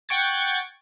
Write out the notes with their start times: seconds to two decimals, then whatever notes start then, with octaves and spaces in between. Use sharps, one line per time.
0.09 F#5 G5 C#6 G#6 A6